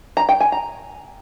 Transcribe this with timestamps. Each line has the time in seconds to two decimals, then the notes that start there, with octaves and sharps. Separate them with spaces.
0.17 A#5
0.29 G5
0.40 G#5
0.52 A#5